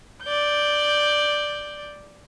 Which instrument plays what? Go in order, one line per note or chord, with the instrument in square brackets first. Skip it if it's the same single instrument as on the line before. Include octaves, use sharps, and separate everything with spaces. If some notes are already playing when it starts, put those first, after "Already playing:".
[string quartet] D5 G6